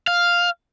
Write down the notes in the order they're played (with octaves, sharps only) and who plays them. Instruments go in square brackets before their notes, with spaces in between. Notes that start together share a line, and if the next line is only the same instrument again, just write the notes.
[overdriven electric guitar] F5